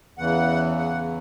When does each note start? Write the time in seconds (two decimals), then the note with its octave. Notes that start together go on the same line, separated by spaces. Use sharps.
0.17 E2 C#3 E3 F#5
0.78 F#5